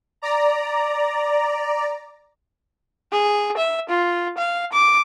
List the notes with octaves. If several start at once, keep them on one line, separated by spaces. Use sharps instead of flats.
D5 A#5
G#4
E5
F4
F5
D6